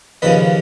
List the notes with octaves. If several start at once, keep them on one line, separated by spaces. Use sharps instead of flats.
D#2 C#3 F3 B4 D#5